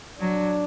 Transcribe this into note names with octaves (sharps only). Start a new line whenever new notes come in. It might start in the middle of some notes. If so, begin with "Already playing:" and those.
F#3 D4